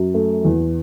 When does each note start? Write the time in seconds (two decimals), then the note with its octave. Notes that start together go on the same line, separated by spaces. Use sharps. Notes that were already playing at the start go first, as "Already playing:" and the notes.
Already playing: F#2
0.14 A3
0.45 E2